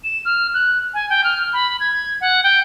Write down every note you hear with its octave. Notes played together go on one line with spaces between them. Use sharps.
E7
F6
F#6
G#5
G5
F6
B5
G#6
F#5
G5